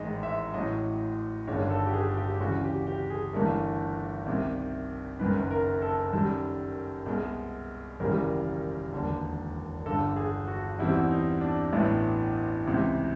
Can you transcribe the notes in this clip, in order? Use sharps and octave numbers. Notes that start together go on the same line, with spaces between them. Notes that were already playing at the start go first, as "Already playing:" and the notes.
Already playing: A1 G#2 D#3 G#3 D#5
E5
A1 A2 F#3 D#5
G1 G2 D#3 G#3 C#5
A4
G4
G#4
G4
D2 C#3 E3 F#4
G4
G4
G#4
G1 G2 E3 A3 A#4
C2 C3 D#3
F#1 F#2 D#3 B4
A#4
A4
F#2 D#3 G3 A4
C2 B2 G#3
G#1 F#2 C#3 E3 G3 A#4
E1 D#2 D3
G1 G2 D3 A4
G#4
F#4
E2 B2 G3 C4 E4
D#4
D4
A1 A2 F#3 B3
C#2 C3 E3